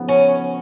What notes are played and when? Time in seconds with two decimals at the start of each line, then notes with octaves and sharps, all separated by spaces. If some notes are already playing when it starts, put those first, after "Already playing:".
Already playing: C#3 F3 B3 D#4
0.09 C#4